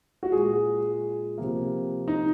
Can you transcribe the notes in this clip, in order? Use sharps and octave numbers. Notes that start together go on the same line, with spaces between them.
F#4
A#2 G#3 G#4
C3 F3 A#3
D#4